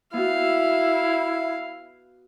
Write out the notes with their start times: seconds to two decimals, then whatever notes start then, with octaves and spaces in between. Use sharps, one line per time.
0.14 B3 E4 F#4 F5